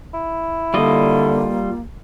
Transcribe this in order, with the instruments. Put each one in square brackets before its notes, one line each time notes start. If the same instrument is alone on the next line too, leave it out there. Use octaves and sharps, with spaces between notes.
[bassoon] E4
[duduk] D3 [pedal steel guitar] G3 F4 D#5 [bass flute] A#3